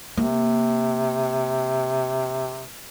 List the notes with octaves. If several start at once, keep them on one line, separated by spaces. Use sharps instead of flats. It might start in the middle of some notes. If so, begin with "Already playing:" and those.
C3 A#3